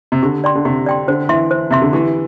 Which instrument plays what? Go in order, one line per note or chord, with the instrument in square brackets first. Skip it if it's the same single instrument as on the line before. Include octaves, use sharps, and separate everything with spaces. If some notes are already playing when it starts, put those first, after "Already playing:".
[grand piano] C3
[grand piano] D3 [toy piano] G4
[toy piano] D5 G5 C6
[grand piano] D3
[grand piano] C3 [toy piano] G4
[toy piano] D5 G5 C6
[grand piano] D3 [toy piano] C5
[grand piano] E3 [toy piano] E5 C6
[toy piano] C5
[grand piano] C3 [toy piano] E5 C6
[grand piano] D3
[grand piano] E3 [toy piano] G4